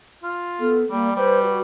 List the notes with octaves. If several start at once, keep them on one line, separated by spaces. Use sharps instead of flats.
F4
B3 A4
G3 A#3 D5
G3 B4 C5
F#4